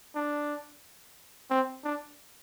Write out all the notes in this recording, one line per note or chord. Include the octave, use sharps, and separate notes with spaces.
D4
C4
D4